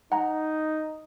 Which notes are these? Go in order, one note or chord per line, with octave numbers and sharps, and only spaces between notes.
D#4 F#5 A#5